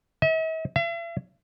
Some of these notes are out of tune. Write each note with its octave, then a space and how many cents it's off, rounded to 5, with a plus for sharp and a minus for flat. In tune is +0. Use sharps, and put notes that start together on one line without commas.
E5 -45
E5 +45